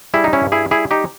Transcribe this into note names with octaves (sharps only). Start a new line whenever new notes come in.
G3 E4 G#4
D#4
C#4 E4
G2
E4 G#4
G3 E4 G#4
D#4 G4